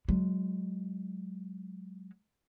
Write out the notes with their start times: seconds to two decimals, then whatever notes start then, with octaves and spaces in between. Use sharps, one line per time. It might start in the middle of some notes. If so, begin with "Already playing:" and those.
0.09 F#3 G#3